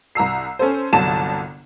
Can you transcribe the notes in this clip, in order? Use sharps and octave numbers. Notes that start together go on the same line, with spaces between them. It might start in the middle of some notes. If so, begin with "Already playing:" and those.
C2 A#5 E6 C7
C#4 A4 C5
G1 C2 F#3 A5 E7